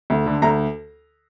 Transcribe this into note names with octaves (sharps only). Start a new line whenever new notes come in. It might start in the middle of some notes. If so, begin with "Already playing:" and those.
D2
D3
D2 A#5